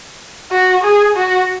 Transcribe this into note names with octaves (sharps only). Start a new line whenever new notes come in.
F#4
G#4
F#4